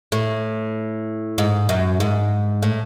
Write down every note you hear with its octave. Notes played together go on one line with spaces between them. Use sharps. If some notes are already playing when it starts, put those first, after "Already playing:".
A2
G#2
F#2
G#2
A2